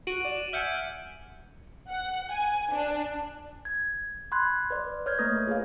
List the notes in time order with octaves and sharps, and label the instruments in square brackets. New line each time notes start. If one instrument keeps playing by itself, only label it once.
[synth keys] F#4 [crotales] D7 D#7 F#7
[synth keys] D5 E7
[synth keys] E5 F#5 G#5 [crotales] F6 G6 C#7
[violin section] F#5
G#5
D4
[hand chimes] G#6
B5 C6 F#6 G#6
B4 D5
C#5 F6 G6 G#6
A3 A#3 B4 D#6 A#6
F4 G#4 A#4 C#5 F5